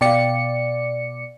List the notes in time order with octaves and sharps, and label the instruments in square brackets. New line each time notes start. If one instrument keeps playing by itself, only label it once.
[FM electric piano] B2 D5 C#7 [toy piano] F5 G5